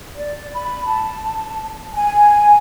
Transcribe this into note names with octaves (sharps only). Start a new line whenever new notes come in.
D5
B5
A5
G#5